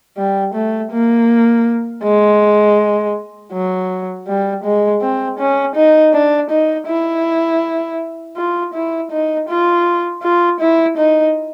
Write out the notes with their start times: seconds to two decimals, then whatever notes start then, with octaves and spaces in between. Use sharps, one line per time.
0.17 G3
0.54 A3
0.92 A#3
2.04 G#3
3.53 F#3
4.27 G3
4.64 G#3
5.02 C4
5.39 C#4
5.75 D#4
6.13 D4
6.51 D#4
6.88 E4
8.37 F4
8.74 E4
9.11 D#4
9.49 F4
10.23 F4
10.60 E4
10.97 D#4